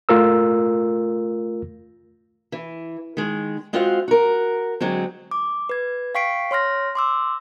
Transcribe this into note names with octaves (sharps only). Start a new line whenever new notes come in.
A3 F4 A#4 E6
E3
D#3 G#3
G#3 C4 F4 F#4 C5 F5
F#4 A#4
D3 F#3 G#3 C4
D6
B4 G#6
F5 G5 C#6 B6 C7 D7
C#5 C6 F6 A#6
C6 D6 E6